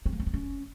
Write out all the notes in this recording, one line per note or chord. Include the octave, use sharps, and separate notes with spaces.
C4
A#3
C4
B3
C#4